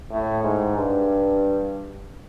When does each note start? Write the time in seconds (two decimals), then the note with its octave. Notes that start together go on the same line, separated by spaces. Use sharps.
0.10 A2
0.43 G#2
0.76 G2